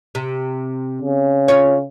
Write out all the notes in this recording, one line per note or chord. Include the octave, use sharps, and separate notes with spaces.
C3
C#3
F4 C#5